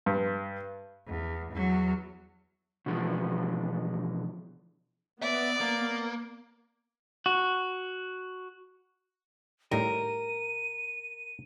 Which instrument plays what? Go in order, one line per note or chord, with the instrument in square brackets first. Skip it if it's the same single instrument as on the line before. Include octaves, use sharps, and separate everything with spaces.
[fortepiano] G2
[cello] E2
E2 F#3
[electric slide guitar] B2 D3 E3 F3 G#3
[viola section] B3 [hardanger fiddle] D5 [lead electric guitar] E5
[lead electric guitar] A#3
[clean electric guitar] F#4
[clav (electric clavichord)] A2 D#3 G3 [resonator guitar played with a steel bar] A#4 [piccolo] D#7